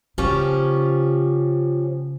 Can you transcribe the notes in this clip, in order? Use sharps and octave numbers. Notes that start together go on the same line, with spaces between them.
C#3 F3 C#4 G4